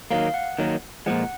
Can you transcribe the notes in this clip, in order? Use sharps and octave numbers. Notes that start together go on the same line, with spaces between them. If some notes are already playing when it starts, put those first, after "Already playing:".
D#3 F#3 A#3 F5
F#5
D#3 F#3 A#3
A#2 F3 G#3 F#5